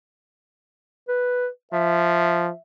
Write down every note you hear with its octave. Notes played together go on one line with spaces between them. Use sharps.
B4
F3 E5